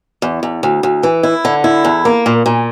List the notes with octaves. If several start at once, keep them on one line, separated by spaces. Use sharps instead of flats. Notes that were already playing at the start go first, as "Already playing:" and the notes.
E2
E2
D2
D2
E3
E4
D3
E4
E2
A#3
A#2
A#2